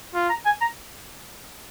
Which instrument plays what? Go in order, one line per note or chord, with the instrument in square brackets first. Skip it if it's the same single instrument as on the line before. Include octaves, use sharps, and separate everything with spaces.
[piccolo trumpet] F4
[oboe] A#5
G#5
A#5